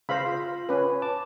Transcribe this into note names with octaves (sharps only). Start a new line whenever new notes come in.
C#3 C5 F5 B5 A#6
F4
C#4 B4
A5 D6